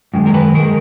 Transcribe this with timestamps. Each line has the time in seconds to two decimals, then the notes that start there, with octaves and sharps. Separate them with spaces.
0.14 F#2 D#3 G#3
0.26 A#4
0.34 B4
0.54 D#3 G#3 A#4